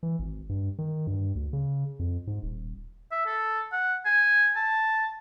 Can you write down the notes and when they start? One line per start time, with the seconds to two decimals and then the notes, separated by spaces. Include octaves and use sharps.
0.03 E3
0.19 G#1
0.49 G2
0.78 D#3
1.07 G2
1.35 D2
1.53 C#3
1.99 F2
2.27 G#2
2.43 D#1
3.12 E5
3.26 A4
3.72 F#5
4.05 G#5
4.56 A5